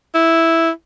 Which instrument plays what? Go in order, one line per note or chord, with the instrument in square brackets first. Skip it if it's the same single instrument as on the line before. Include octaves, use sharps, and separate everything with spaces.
[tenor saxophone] E4